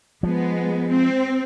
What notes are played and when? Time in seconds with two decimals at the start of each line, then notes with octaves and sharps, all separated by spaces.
0.23 F3 G#3 B3
0.90 C4